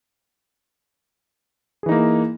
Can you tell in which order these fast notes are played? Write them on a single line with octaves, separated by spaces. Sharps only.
G#4 E3 D#4 A#3